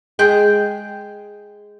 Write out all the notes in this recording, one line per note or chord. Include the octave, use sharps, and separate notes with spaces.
G#3 G#4 G5